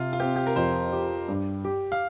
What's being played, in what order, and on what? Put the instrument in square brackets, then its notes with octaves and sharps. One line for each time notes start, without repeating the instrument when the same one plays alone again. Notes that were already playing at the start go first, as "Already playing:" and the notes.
Already playing: [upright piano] C3 [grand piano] F4
[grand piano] F4
[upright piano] C4 [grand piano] G4
[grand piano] G4
A#4
[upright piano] F2 [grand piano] C5
[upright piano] G4
G2
G4
[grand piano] F5